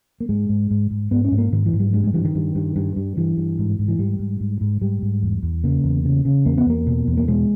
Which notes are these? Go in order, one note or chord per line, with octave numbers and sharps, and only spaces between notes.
A#3
G#2 G#3
G#2
G#2
G#2
G#2 B3
C#4
G#2
A#3
G#2 D#3
E3
G#2
G3
G2 G#3
G#3
G2 E3
D#3
G2
G2
G2
G2
G2 E3
G2
G#2
G#2
E3
G#2 G3
G#2
G#2
G#2
G#2 G3
G#2
E2
E2
C#3 A#3
E2
C#3
C#3
E2 A#3
B3
E2 A#3
B2
E2
A#3
B2 G#3